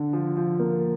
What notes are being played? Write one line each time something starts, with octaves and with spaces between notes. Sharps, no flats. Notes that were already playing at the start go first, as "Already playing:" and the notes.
Already playing: D3 D4
F3
F3
A#3